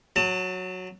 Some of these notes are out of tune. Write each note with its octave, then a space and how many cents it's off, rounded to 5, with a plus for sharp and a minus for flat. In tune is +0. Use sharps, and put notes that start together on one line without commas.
F#3 -5 A5 +35